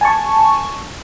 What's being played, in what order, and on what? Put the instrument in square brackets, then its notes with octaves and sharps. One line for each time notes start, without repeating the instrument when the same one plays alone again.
[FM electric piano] G#5 A5 C#6